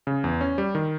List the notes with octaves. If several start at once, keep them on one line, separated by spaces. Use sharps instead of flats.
C#3
E2
C#4
G3
D#3